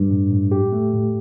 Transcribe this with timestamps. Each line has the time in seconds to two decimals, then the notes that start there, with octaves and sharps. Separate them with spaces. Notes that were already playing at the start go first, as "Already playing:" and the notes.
Already playing: G2
0.11 A2
0.31 A2
0.52 G4
0.72 A3
0.93 A2